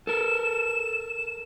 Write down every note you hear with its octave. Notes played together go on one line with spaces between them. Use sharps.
A4 A#4 E7